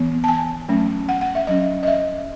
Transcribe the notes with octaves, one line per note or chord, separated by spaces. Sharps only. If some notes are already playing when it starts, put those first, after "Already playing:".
Already playing: E3 B3
A5
G#5
F#3 A3 C#4
F#5
F#5
E5
F#3 C#4 D#5
D#5
E5